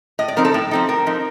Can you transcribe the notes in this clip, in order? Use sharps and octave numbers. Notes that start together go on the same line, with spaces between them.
A2 D#5
D5
F3 C4 D#4 A#4
A4
A2
F3 C4 D#4
A2 A#4
F3 C4 D#4